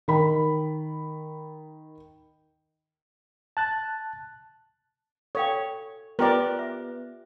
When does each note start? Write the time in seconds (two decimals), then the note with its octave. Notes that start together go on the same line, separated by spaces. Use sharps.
0.08 D#3 B5
3.57 A5 F#6 A6
5.35 A4 C#5 F5 G5
6.19 B3 F4 G4 A#4 D5 G5
6.59 E5